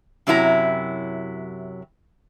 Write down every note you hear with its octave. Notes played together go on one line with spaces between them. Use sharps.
F#2 C3 F#3 E4 G4 A#5